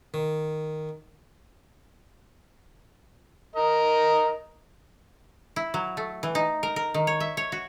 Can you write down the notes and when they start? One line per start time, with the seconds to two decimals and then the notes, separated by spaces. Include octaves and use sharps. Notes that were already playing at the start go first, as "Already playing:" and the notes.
0.14 D#3
3.56 A#4 D#5
5.56 E4
5.74 F#3
5.97 A3
6.23 E3
6.35 D#4
6.63 A#4
6.76 A#4
6.94 D#3
7.07 C#5
7.20 E5
7.37 C#5
7.52 F#4